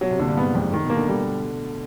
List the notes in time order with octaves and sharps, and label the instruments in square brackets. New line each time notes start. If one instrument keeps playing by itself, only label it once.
[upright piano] B2 [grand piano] F#3
[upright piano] C3
[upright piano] A#2 [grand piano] D3
[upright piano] G2
[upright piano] G#2 [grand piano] B3
[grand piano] F2 [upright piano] G#2
[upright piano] A2 [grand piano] D#3
[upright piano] B2
[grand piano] A#3
[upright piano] D3
[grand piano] G3